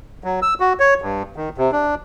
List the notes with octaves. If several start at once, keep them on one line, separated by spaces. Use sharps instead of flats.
F#3
E6
F#4
C#5
G2
D#3
C3
D4